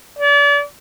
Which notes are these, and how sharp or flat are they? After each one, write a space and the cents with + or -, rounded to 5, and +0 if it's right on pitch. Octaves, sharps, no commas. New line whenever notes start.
D5 -35